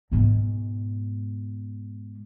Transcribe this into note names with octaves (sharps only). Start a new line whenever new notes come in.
G#2 B2